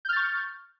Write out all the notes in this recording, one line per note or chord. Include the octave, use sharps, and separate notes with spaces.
C#6 F6 G6 A6